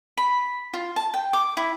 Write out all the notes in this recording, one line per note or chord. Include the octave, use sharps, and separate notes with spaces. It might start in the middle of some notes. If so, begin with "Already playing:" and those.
B5
F4
A5
G5
D6
E4